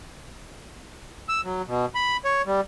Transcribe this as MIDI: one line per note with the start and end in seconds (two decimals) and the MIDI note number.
1.29 1.41 88
1.45 1.62 54
1.67 1.86 47
1.95 2.17 83
2.25 2.42 73
2.46 2.61 55